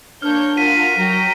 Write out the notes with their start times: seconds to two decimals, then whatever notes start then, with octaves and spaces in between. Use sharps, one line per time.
0.22 A#3 D4 C#5 F6 G6
0.57 F4 F#4 A#4 B6 D#7
0.96 F#3 A#4 G5 A#5